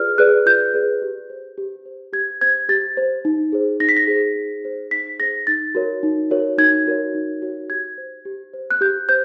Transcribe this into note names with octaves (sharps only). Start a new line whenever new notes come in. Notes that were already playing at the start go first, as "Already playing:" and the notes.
Already playing: F4 G#4 B4 D5 F6
G#4 B4 D5 F#6
F4 G6
G#4 B4 D5
G4
C5
G4
C5
G4 G#6
C5 G#6
G4 A6
C5
D#4
G#4 C5
D#4 A#6
B6
A#6
G#4 C5
D#4
G#4 C5
D#4 B6
G#4 C5 A#6
D#4 A6
F#4 A#4 C#5
D#4
F#4 A#4 C#5
D#4 G#6
F#4 A#4 C#5
D#4
F#4 A#4 C#5
G4 G#6
C5
G4
C5
F#6
G4 G6
C5 G6